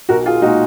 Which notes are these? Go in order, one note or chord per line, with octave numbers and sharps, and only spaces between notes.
B1 F#4 A#4
F4 G#4
A#2 G#3 D#4 F#4